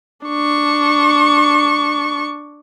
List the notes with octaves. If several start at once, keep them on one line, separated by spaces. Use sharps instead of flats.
D4 C#6